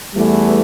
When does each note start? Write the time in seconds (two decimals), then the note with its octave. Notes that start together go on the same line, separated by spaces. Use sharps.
0.14 E2 E3 G3 A3